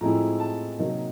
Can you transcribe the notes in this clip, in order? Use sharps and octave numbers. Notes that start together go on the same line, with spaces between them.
A2 F3 G#3 C4 E4 A#5
A5
C3 D#3 F#3 A#3 D#4